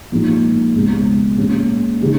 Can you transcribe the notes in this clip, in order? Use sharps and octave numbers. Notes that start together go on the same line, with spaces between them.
A#2 F3 G#3 D#4
C#2 B2 G#3
A#2 G#3 C#4
C#3 G#3 D#4